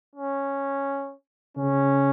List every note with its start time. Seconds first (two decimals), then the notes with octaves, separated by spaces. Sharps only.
0.15 C#4
1.57 C#3 C#4